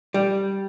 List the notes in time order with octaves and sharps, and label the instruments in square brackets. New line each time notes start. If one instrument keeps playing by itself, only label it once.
[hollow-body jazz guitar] G3